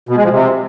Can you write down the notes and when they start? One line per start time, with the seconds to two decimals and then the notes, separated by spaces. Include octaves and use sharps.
0.09 B2
0.16 G#3
0.24 F3
0.31 C3